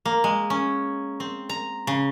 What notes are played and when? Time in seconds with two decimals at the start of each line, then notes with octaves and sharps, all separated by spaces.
0.05 A#3
0.24 G#3
0.50 C#4
1.20 C4
1.49 A#5
1.87 C#3